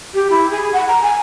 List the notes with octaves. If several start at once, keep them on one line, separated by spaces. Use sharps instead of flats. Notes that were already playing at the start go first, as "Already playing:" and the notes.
G4
E4
G#4
F#5
A#5
G#5